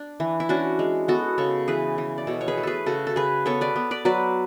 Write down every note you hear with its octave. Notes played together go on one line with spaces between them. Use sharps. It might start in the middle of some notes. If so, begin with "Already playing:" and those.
Already playing: D4
E3
E4
C#4 D4 F#4
G#3
B3 F#4 A4
C#3 A4 C#5
E3 G#4 B4
E3
D5
B2 A4 C#5
C#5
G#4 B4
A3
G#4 A4 B4
C#3 F#4 A4
A4
C#3 G#4 B4
B3 A4 C#5
B4 D5
B3
B4 D5
F#3 B4 D5